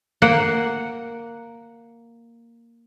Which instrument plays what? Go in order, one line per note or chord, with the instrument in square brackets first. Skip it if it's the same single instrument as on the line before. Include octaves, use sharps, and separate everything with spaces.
[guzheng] A#3 F#5